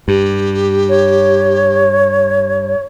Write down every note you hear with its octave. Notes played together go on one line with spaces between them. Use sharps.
G2 G4
C#5